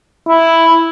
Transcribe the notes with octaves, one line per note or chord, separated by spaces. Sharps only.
E4